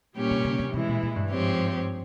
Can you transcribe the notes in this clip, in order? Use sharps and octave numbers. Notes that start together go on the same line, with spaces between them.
A#2 G3 C#4 G4 C#5
C3
C#3
C3
C3 E3 G#3 E4
A#2
A#2
G2
G#2 F3 C4 G4 C#5